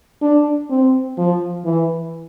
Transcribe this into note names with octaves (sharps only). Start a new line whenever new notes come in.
D4
C4
F3
E3